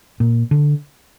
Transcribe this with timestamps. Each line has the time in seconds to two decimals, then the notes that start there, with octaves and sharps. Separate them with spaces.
0.20 A#2
0.51 D3